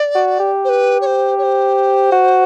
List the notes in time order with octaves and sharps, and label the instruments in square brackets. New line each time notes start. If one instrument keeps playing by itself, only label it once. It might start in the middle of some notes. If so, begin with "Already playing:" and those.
Already playing: [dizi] D5
[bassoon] F#4
G4
[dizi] C5
B4
C#5
C5
C#5
C5
[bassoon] F#4